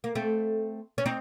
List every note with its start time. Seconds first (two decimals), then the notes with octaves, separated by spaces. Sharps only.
0.04 A#3
0.15 A3 C4
0.98 C#4
1.06 C4 D#4